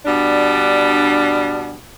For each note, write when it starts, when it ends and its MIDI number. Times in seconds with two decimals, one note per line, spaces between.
0.06 1.77 47
0.06 1.77 55
0.06 1.77 62